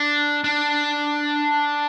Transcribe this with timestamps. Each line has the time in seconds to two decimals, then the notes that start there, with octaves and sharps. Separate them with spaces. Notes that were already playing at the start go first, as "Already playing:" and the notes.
Already playing: D4
0.44 D4